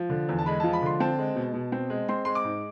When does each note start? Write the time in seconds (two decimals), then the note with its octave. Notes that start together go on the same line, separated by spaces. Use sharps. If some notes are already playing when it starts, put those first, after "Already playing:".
Already playing: F3
0.10 D3
0.29 E2
0.39 A5
0.46 G#3 B5
0.60 F3 A5
0.73 B5
0.82 D3 C6
1.00 C4 A5
1.19 G#3
1.36 B2
1.54 B2
1.72 C4
1.90 G#3
2.09 C4 C6
2.25 G#3 C6
2.35 D6
2.44 G#2